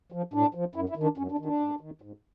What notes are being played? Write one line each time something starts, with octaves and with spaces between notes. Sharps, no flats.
F3
A2 D4
F3
F#2 E4
E4
D#3
D4
F#2 C#4
D4
D#3
D4
G#2
D#3
G#2